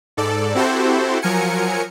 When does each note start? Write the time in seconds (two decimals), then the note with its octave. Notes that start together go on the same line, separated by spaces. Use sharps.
0.17 G#2 A4 D5
0.55 C4 E4 F#4 G4 A4 C5
1.22 F3 F#3 A#4 G#5 C#7